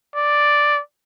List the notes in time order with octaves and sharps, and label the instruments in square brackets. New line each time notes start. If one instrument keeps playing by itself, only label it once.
[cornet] D5